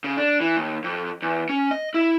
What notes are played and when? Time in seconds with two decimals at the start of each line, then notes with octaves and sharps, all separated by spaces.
0.04 C#3
0.17 D4
0.41 E3
0.57 D#2
0.84 F2
1.22 E2
1.49 C#4
1.71 D#5
1.94 E4